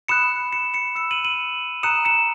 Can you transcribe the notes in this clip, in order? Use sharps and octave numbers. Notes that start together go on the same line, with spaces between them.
B5 D#6 F#6 C#7 E7
C#7 E7
C#7 E7
B5 E6 C#7 E7
D#7 F#7
D#7 F#7
A#5 D#6 F#6 C#7 E7
C#7 E7